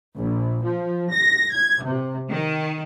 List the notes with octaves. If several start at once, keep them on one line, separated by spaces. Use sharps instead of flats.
A#1
F3
A#6
G#6
C3
D#3